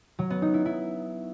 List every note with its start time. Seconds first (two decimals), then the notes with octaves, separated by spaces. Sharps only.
0.19 F#3
0.30 B3
0.42 D#4
0.54 E4
0.65 E4